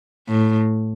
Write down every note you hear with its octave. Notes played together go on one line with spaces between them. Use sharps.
A2